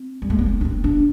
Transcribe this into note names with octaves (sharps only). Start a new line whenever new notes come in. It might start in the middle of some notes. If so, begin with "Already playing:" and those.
Already playing: C4
G3
A3
B3
C4
D4
C4
D4